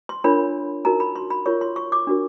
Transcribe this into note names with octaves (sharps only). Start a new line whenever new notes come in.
C6
D4 F4 A#4 C#5 B5
D#4 F#4 A#4 A#5
B5
C6
B5
F4 A#4 C#5 C#6
C6
C#6
D6
D4 F#4 A#4